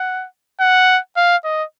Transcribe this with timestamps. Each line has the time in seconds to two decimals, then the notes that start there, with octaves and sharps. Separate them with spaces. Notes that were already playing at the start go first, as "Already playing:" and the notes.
Already playing: F#5
0.60 F#5
1.17 F5
1.44 D#5